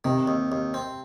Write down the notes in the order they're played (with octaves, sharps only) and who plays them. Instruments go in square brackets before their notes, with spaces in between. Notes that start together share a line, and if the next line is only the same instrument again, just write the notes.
[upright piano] C3 [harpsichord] D#3
[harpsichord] D#2
D#2
C4